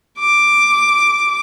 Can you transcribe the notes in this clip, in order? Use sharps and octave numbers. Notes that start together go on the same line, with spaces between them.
D6